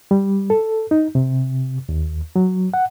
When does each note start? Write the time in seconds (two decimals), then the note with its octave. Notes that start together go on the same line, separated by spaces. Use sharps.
0.11 G3
0.50 A4
0.91 D#4
1.15 C3
1.89 D#2
2.36 F#3
2.74 F#5